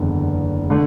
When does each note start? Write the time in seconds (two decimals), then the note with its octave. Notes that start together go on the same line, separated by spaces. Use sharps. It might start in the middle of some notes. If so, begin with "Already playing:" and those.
Already playing: F#1 E2 D3
0.70 D3 A3